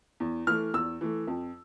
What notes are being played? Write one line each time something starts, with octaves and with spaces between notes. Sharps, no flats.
E2
E3 A3 F6
E2 E6
E3 A3
F2